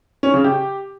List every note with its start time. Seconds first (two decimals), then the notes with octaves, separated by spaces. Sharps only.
0.23 C#4
0.34 C#3
0.44 G4